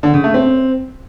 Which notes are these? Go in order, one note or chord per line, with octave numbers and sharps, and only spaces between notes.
D3
C#3
A3
C4